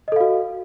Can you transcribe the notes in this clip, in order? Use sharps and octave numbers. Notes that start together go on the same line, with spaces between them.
F#4 A4 D#5 F5